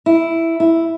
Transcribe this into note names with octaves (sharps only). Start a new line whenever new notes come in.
E4
E4